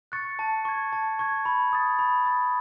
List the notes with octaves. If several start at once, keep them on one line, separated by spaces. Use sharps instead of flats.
C#6 F#6 A6 C#7
A5
C#6 G#6
A5
C#6 G#6
B5
D#6 A6
B5
D#6 A6